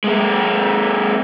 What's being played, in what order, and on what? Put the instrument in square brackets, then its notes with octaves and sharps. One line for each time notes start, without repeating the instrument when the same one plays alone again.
[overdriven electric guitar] G#3 A#3